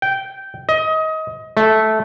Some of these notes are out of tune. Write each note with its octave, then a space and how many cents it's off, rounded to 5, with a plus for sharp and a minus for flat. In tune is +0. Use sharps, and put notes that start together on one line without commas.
G5 -10
D#5 +25
A3 -10